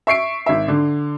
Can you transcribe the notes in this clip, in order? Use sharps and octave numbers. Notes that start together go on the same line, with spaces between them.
E5 C#6 C7 D7
G#1 E5
D3